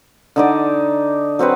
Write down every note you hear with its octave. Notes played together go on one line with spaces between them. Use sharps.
D3 D#4 D5
F#3 C4 F#4 B4